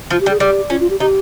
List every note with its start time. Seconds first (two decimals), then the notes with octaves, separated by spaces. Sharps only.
0.10 F3 F4
0.21 G4
0.26 G3
0.31 G#4
0.40 G3 G4
0.70 C#4 F4
0.80 F4
0.90 G4
1.00 D#4 G4